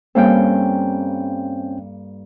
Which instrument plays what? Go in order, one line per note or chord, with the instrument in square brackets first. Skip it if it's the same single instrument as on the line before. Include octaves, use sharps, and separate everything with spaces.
[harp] G2 A#3 A4 [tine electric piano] C4 C#4 G5